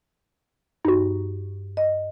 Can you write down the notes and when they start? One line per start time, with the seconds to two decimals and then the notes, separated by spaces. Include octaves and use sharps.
0.85 G2 D#4 F#4
1.77 D#5